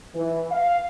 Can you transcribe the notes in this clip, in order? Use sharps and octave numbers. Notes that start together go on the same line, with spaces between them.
E3
F5